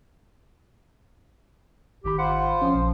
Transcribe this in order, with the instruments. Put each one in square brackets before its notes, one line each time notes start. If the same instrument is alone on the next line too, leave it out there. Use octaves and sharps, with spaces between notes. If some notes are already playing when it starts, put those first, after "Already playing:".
[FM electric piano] G#1 D#3 B5 [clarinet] G4
[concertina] F4 C5 [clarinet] F#5
[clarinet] F3 [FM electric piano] C#4
[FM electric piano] A#1